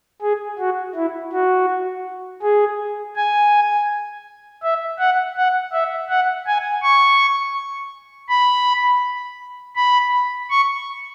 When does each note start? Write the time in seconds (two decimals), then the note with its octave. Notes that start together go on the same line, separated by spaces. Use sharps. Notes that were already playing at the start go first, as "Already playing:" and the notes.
0.22 G#4
0.59 F#4
0.95 E4
1.33 F#4
2.43 G#4
3.16 G#5
4.63 E5
4.99 F#5
5.37 F#5
5.72 E5
6.09 F#5
6.47 G#5
6.82 C#6
8.29 B5
9.76 B5
10.50 C#6